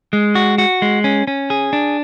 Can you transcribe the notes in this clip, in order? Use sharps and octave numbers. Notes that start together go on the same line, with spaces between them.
G#3
F#4
F#4
G#3
C#4
C#4
G#4
D4